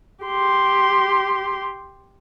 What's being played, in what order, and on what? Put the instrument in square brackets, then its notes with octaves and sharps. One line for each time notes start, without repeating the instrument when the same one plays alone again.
[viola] G4 C6